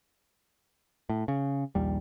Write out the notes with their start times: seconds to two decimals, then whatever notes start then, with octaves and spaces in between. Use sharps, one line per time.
1.09 A2
1.28 C#3
1.75 A#1 D#2 G3